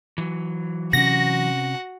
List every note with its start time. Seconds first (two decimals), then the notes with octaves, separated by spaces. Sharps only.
0.18 E3 F#3
0.93 C3 C4 C#4 F#4 F#5 A#6